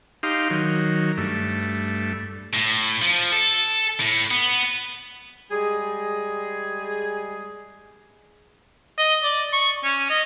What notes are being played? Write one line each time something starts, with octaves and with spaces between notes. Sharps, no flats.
D#4 G4 F5 C6
D#3 F#3
G2 A3
A2
F3
A4
A2
B3
G3 G#3 G#4
D#5
D5
C#6
C#4
D#5